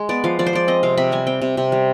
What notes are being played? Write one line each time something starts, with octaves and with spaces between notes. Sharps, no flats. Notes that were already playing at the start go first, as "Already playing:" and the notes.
Already playing: G#3
B3 D5
F3 F5
F3 D5
C5
G#3 D5
C4 D#5
C3 F5
C3 B5
G3 G#5
C4 G5
C3
C3
G3